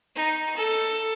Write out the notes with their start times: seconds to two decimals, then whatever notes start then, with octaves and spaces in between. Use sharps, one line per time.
0.16 D#4
0.56 A4